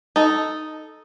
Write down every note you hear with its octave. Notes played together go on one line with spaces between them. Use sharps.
D#4 A4